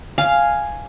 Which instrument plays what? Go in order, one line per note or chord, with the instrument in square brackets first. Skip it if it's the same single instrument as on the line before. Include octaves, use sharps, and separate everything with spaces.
[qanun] F5 [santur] G#5